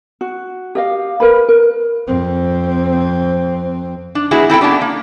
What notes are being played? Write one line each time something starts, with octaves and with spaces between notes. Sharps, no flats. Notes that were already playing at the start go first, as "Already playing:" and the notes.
F#4
G4 D#5 F5
A#4 B4 B5
A#4
F2 C4
D4
G#3 B3 E4 F#4 G#4
C4 E4 A4 G5
B3 C#4 D4 G4
A#3